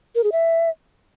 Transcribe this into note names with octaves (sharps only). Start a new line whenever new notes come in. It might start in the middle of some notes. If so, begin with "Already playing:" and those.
A#4
G#4
E5